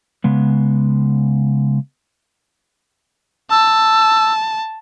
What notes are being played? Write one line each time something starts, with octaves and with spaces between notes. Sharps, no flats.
C#3 G#3 B3
A5 E6